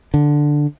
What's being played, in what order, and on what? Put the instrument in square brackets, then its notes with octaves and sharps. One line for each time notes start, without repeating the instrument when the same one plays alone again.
[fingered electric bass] D3